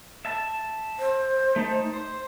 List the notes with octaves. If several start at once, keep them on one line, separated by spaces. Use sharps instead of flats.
E5 A5
C5
A3 D#4 A5
C5